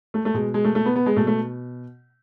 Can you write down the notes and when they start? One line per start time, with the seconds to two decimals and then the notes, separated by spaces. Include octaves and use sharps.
0.14 A3
0.25 A3
0.34 B2 G#3
0.54 G#3
0.65 A3
0.75 A3
0.86 B3
0.96 B3
1.06 G#3
1.16 B2 A3
1.27 A3